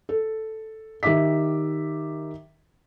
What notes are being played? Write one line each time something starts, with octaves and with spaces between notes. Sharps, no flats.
A4
D#3 G4 E5 D6 B6